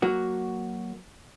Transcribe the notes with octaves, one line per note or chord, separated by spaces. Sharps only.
F#3 A#3 F#4